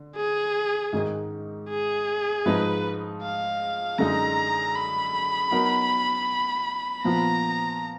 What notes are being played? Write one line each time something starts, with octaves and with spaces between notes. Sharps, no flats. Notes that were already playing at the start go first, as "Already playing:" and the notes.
Already playing: D3
G#4
G#2 D#3 G#3 D#4
G#4
G#2 F3 G#3 D#4 B4
F5
F#2 D3 G#3 D#4 A#5
B5
F#3 B3 D#4 F#4 A#4
A#2 F3 B3 F4 A#5